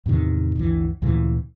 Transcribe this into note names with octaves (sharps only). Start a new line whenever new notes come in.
E2 A2 C3 D#3
G1 D2 E3
D2 A#2 C#3 E3